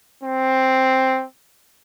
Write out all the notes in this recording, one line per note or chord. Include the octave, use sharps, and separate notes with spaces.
C4